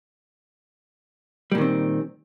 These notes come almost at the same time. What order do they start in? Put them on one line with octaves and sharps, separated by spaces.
G3 A#2 D#3 C4